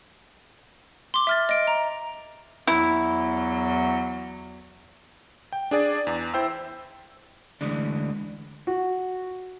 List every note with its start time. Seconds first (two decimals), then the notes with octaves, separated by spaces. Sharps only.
1.14 C6 D6
1.27 E5 F6 A6
1.49 D#5 D7
1.67 A#5
2.67 E2 F#3 E4
5.53 G5
5.71 D4 G#4 D5 A6
6.07 E2
6.34 E4 C5 G5 E6
7.61 D2 E3 G#3 D4
8.67 F#4